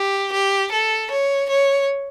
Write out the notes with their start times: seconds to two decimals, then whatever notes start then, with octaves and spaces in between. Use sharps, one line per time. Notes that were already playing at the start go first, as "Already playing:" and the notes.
Already playing: G4
0.32 G4
0.72 A4
1.10 C#5
1.50 C#5